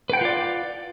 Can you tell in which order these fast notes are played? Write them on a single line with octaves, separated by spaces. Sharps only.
B4 G5 F#5 F4 D5